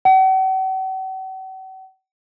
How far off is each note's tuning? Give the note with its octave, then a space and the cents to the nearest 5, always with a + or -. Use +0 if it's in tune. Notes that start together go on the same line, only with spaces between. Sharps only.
F#5 +45